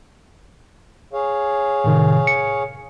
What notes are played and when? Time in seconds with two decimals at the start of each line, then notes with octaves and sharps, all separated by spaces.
1.13 G#4 C#5 F5
1.84 A2 C3 D#3
2.27 C#7